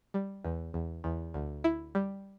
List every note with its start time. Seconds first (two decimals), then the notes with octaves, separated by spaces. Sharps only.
0.14 G3
0.45 E2
0.74 E2
1.04 E2
1.34 D2
1.64 E4
1.95 G3